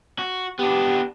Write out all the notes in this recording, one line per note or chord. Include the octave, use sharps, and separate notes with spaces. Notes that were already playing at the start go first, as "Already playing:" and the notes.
F#4
B3 D4 G4